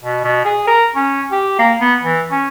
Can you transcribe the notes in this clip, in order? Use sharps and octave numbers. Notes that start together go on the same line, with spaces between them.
B2
B2
G#4
A#4
C#4
G4
A#3
B3
E3
C#4